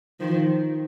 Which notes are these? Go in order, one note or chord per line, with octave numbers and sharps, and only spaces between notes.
D#3 F3